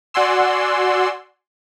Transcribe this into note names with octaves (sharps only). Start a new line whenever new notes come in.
F#4 D5 F#5 G#5 C6 E6